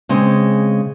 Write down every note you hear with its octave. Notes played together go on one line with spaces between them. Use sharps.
C#3 G#3 C4